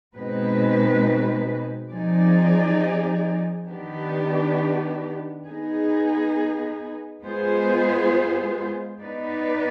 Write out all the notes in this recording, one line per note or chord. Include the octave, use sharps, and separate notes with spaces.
B2 G#3 C4 D#4 B4
F3 C4 D#4 G#4 D5
D#3 B3 D4 G4
B3 D#4 G#4
G#3 B3 F4 G#4 C5
B3 D#4 B4 D5